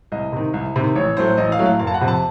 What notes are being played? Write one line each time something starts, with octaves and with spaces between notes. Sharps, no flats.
C2 D#5
C3 D#3
C2
C3 D#3
A1 C#5
A2 F#3 A3 C5
A1 D#5
F5
A2 F#3 A3
F5
F#1 F5
A5
F#5
F2 C3
A5